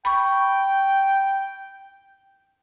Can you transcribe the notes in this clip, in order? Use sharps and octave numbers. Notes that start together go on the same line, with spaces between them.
G5 B5 C#6